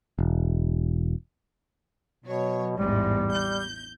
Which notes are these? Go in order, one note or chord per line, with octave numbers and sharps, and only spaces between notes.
E1
B2 F#3 C#5
A1 E2 G#2 G3
G6